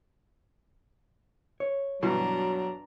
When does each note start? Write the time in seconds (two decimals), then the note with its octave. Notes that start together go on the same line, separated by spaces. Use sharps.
1.60 C#5
2.03 G2 B2 E3 F#3 D4 A#5